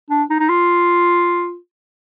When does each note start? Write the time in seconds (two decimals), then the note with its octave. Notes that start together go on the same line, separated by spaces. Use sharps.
0.10 D4
0.30 D#4
0.40 D#4
0.49 F4